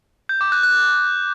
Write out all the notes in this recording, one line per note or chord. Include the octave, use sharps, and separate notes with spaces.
G6
D6
F#6
F#6